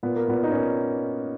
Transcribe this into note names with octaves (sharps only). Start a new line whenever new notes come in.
A#2 B3
A#3
A#2 B3
D#4
A#2 C#4